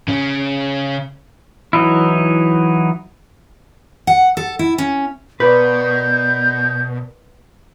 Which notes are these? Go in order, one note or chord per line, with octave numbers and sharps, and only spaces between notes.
C#3 C#4
E3 F#3 D#4 E4
F#5
A4
E4
C#4
B2 A#4 B4 D5 G6